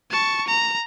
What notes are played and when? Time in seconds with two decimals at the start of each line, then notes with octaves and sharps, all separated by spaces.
0.11 A5 C#6
0.47 A#5